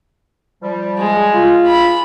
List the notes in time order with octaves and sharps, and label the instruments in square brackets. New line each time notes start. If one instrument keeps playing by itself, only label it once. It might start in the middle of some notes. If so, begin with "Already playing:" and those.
[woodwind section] F3 G3
[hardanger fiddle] G#3
[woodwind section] F4
[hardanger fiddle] B5